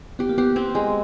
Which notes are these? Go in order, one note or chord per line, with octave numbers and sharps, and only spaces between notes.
B3 G4
A#3
B3 G4
C4
G#3